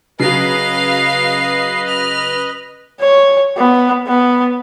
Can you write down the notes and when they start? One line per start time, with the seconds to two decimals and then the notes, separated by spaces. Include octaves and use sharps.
0.20 C#3 F#3 B4 D#5 F5 C7
1.87 F6
3.00 C#5
3.57 B3
4.07 B3